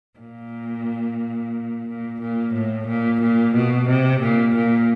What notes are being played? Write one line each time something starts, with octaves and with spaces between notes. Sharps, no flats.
A#2
A#2
A#2
A2
A#2
A#2
B2
C3
A#2
A#2